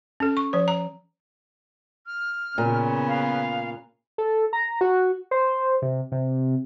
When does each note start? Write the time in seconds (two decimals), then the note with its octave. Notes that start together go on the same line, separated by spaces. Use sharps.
0.20 C#4 A4
0.37 C#6
0.53 F3 C5
0.68 A#5
2.07 F6
2.58 A#2 C#3 B3
3.08 F5
4.18 A4
4.53 A#5
4.81 F#4
5.31 C5
5.82 C3
6.12 C3